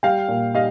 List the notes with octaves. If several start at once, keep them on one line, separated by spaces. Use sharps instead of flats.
G3 F5 G5
A#2
G3 D#5 F5